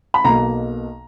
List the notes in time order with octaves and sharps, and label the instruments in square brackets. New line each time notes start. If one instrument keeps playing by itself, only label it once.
[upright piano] B5
B1 B2 A#3 A#5